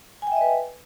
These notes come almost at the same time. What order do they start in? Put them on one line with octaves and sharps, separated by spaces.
G#5 G5 E5 D#5 B4